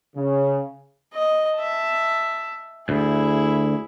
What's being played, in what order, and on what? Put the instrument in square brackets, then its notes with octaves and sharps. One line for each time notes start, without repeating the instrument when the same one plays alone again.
[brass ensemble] C#3
[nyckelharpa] D#5
E5 A5
[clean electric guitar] D2 [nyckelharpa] E4 G#4